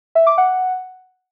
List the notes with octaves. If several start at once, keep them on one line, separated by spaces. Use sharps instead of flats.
E5
D6
F#5